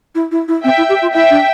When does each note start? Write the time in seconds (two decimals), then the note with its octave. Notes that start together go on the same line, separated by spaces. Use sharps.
0.15 E4
0.31 E4
0.48 E4
0.64 C4 E5 G5
0.77 E4
0.89 G4
1.02 F4
1.14 E4 E5 G5
1.30 D4